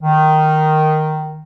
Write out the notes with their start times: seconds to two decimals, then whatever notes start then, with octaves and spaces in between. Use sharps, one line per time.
0.02 D#3